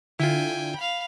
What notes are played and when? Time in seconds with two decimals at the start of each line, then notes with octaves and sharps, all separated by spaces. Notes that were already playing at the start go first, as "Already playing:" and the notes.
0.20 D3 E4 F4 G5 G#5
0.76 F5 B5